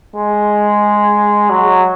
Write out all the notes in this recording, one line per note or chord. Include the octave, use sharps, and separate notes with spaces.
G#3
F#3